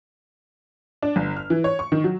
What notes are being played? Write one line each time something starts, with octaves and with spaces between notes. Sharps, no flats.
D4
G1
F6
E3
C#5
C#6
D#3
F#3